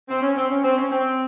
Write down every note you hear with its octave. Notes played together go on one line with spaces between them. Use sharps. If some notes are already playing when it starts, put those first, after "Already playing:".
C4
C#4
C4
C#4
C4
C#4
C4